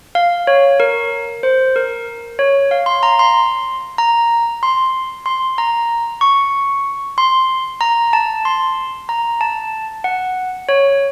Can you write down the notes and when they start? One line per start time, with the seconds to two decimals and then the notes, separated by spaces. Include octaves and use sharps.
0.15 F5
0.47 C#5
0.80 A#4
1.43 C5
1.76 A#4
2.39 C#5
2.71 F5
2.86 C6
3.03 A#5
3.19 C6
3.98 A#5
4.63 C6
5.26 C6
5.58 A#5
6.21 C#6
7.18 C6
7.81 A#5
8.13 A5
8.45 C6
9.09 A#5
9.41 A5
10.04 F#5
10.69 C#5